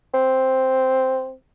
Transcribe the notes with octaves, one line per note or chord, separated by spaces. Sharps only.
C4